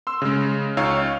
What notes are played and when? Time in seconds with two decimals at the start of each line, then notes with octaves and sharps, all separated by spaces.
0.07 C6 E6
0.22 C#3 G#3
0.77 C#2 D#4 C#5 F5 E6